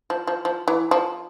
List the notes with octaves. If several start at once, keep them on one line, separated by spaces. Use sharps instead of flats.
F3
F3
F3
E3
F3